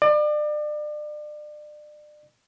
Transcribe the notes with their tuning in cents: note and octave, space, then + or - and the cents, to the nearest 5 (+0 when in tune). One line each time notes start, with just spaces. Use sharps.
D5 +35